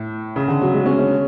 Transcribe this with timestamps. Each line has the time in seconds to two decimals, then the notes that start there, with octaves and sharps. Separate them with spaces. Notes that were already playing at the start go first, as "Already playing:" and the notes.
Already playing: A2
0.36 C#3
0.48 D3
0.62 F#3
0.74 G#3
0.86 C#4
0.99 C#4